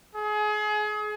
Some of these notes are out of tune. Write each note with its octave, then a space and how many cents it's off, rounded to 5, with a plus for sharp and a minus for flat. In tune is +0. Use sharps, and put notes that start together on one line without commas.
G#4 +30